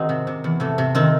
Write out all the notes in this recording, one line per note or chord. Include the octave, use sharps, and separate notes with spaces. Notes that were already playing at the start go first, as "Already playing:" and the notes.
Already playing: D#3 C4 D#4 F#4 G#4
C3
C3
E2
C3 A3
C3
D#3 C4